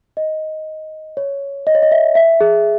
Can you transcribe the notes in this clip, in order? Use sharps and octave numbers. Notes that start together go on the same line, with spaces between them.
D#5
C#5
D#5
C#5
D#5
E5
E5
G#4